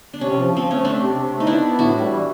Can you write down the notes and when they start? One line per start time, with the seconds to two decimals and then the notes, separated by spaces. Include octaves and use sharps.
0.13 D4
0.21 C3 C#4
0.37 F3
0.53 F3 C4
0.69 A3 C#4
0.84 A3 C4 D4
1.00 C3
1.16 C3
1.32 A3
1.40 D#4
1.47 B3 D4 E4
1.64 B3
1.79 A2 E4 F#4
1.95 G3
2.10 E3